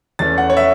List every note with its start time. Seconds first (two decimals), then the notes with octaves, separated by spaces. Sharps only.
0.19 E2 E3 A3 C#4 A6
0.38 F#5
0.50 C#5
0.57 E5